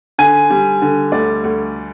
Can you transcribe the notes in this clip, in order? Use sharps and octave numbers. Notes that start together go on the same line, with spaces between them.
D3 G#5
G3
D3
D2 D5
D2